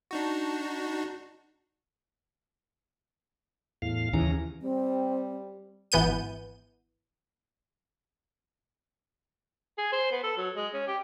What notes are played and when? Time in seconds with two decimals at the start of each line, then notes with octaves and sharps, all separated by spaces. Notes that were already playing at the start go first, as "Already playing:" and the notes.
0.11 D4 D#4 F#4
3.82 E2 A2 F5
4.13 D#2 C#3 E3 C#4 A#5
4.62 G3 C4
5.92 G#1 E3 B3 G6 D#7
9.78 G#4
9.92 C5
10.11 B3
10.23 A4
10.37 F#3
10.56 G#3
10.74 C#4
10.87 G4